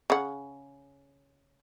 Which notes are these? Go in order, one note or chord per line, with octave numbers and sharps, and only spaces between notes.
C#3 F#5